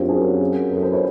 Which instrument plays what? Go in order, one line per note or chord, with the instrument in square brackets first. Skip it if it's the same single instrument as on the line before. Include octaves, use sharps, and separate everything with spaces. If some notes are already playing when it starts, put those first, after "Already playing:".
Already playing: [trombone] F#2 [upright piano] C4 D4 F4 G4
[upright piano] G#4 A#4
[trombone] F#2 [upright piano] A4 B4
[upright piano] A#4 C5
B4 C#5